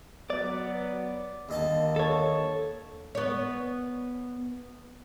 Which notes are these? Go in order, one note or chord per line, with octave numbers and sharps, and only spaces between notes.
F#3 B3 D5
D#2 D3 A#3 D#5 A5
A4 C#5
B3 C#5